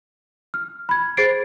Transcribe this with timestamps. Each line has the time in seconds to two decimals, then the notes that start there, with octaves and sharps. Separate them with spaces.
0.54 F6
0.89 B5 G#6
1.17 G#4 C5 A6 C7 D7